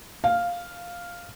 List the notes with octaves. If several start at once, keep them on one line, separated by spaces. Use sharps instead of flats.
F5